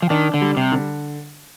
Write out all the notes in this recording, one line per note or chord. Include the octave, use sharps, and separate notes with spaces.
F3
D#3 D4
D3
G3
C3
D3